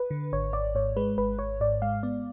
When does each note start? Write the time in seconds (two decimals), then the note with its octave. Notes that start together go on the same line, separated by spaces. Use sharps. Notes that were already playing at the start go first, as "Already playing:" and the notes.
Already playing: B4
0.11 D3
0.33 G#1 C#5
0.53 G#1 D5
0.75 G#2 C#5
0.96 G#3 B4
1.18 G#1 B4
1.39 G#1 C#5
1.60 G#2 D5
1.82 G#3 F5
2.03 B3 D5